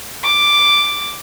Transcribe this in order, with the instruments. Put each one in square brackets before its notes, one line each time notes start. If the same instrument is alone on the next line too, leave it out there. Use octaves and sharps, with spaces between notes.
[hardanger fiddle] D6